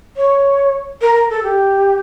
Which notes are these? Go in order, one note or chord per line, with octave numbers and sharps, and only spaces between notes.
C#5
A#4
A#4
A4
G4